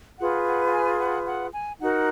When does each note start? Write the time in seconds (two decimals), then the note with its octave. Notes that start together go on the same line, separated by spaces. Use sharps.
0.18 F4 G#4 B4 F#5
0.46 F#5
0.67 F#5
0.72 G#5
1.00 F#5
1.27 F#5
1.54 G#5
1.80 D#4 F#4 A#4 F#5